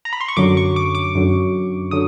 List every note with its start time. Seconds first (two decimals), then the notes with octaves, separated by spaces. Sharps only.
0.05 A#5
0.13 B5
0.21 C6
0.28 C#6
0.37 F#2 D3 F#3 D6
0.57 C#6
0.76 D6
0.95 D6
1.15 F#2 D3 F#3
1.91 D3 F#3 D#6